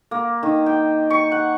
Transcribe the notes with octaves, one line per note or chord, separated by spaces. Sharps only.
A#3
D#3
G5
C#6
F#5